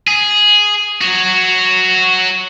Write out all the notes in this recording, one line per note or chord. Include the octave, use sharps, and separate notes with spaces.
G#4
F#4 C#5